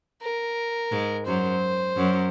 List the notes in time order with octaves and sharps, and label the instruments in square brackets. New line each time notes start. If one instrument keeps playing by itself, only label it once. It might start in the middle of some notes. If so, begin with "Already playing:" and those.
[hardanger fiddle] A#4
[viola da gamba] G#2 G#3
[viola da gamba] F#2 F#3 [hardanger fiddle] C5
[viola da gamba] F#2 F#3